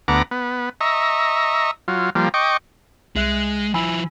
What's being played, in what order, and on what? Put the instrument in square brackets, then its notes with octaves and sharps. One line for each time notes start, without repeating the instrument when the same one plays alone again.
[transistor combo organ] D2 B3 F#5 A#5 D6
B3
D#5 E5 A#5 C#6
F#3 F4
F3 G3 A#3
D#5 G5 C#6 D6
[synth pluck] C2 E5 F#6 [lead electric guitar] G#3
[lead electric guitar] F3 E4 [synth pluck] G#5 B5 E6